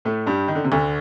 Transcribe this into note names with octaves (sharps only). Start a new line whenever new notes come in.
A2 A3
G2 G3
D#3
D3
C3
D2 D3